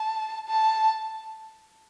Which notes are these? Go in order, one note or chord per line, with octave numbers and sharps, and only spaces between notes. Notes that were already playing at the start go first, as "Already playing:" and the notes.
Already playing: A5
A5